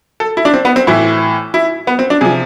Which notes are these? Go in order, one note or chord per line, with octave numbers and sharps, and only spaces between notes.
A4
E4
D4
C4
B3
C4
A2 E3 E4
E4
B3
C4
D4
C3 F3 G#4